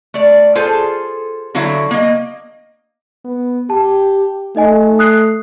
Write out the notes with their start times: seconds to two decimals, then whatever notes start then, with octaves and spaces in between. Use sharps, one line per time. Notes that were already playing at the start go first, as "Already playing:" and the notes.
0.14 A3 D5
0.55 F4 G#4 A4 C5
1.55 D3 F#3 E4 F5
1.91 A#3 D#5
3.24 B3
3.70 G4 A5
4.56 A3 D#4 D#5 G#5
4.99 D#6 F#6 C7